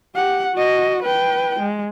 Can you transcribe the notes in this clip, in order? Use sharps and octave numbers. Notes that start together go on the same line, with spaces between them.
G4 F#5
F#4 D#5
B4 G5
G#3